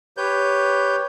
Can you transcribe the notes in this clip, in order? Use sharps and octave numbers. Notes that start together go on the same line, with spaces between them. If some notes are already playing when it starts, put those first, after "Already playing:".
G4 B4 C#5 G6